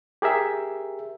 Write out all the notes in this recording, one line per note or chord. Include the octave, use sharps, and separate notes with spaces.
G4 G#4 A#4 E5